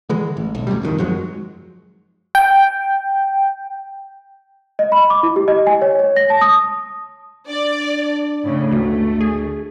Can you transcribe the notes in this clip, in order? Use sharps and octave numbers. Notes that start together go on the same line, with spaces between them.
D3 E3 G#3
A1
B1
F#2 A2 F#3 G3
F1 F2 B2 D#3
F#2 F3 F#3 G#3
G5
D#5
B5
D6
E4
G4
D#5
G#5
C#5
C#5
A#6
A5
D#6
D4 D5
A2 C#3
G1 D2 A3
G#4